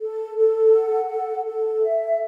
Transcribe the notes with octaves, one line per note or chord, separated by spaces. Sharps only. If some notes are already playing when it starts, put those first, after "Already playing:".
A4
A4
F#5
A4
A4
E5